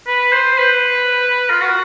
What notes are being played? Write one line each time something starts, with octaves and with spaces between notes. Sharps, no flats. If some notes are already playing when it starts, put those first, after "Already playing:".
B4
C5
B4
F4
F#4